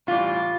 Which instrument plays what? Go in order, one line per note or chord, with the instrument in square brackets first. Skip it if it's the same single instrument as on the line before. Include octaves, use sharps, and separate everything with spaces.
[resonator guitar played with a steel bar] A2 E3 G3 F4